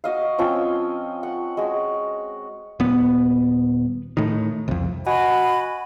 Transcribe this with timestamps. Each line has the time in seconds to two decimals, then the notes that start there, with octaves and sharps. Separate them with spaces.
0.04 F#4 D#5 F5
0.38 F3 C4 C#4 F4
1.23 F#5
1.57 G#3 F#4
2.80 D#1 B3
4.17 A2 D#3
4.68 C2 F2
5.07 F#4 D#5 G#5 B5